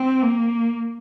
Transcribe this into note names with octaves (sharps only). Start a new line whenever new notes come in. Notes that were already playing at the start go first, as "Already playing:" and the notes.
Already playing: C4
A#3